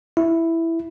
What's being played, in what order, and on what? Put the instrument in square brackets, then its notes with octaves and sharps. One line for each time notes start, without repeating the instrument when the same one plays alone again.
[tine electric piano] E4